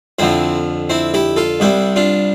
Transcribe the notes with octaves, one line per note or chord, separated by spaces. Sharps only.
F2 D3 F3 C4 E4
C4 E4
E4 G4
F4 A4
C2 C3 G3 E4 G4
D4 F4